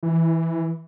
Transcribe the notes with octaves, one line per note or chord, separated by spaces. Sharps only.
E3